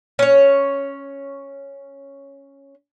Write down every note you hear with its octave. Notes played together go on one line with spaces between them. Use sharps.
C#4 C#5